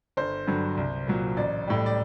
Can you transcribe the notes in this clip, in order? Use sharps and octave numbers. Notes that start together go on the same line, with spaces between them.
G1 C5
G2 D3 F#3
C2
A#2 F#3
A1 D5
A2 G3
D5